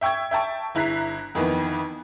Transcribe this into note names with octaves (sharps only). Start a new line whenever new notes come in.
E5 G5 C#6 E6 G#6
E5 G5 A5 C#6
G1 E4 A#5 F#6 B6 C7
F2 D#3 E3 B3